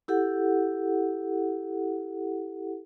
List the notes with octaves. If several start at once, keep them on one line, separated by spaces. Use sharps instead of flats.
E4 G4 A4 F#5